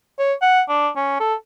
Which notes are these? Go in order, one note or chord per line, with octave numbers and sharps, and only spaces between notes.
C#5
F#5
D4
C#4
A4